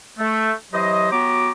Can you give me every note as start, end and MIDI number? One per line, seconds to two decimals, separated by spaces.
0.18 0.51 57
0.73 1.11 52
0.73 1.11 54
0.73 1.11 67
0.73 1.11 72
0.73 1.11 75
1.12 1.51 54
1.12 1.51 59
1.12 1.51 66
1.12 1.51 67
1.12 1.51 82
1.12 1.51 86